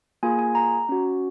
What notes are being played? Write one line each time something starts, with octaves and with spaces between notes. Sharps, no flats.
A#3 F4 G#4 G#5
G#5
A#5
C#4 F#4